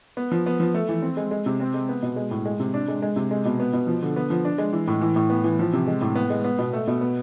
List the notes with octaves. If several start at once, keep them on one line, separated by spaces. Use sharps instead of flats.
B3
F3
B3
F3
A3
E3
C4
G#3
G#3
C3
C4
G#3
B3
B2
G#3
A2
G#3
C3
D4
G#3
G#3
C3
G#3
B2
B3
B2
F3
D3
B3
F3
D4
G#3
E3
A2
E3
A2
B3
E3
F3
C3
G#3
A2
B3
G#3
B3
B2
A3
B2
B3